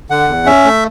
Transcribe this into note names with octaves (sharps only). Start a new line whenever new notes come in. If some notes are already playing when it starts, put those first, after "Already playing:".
D3 F#5
E2
C#4 E5
A3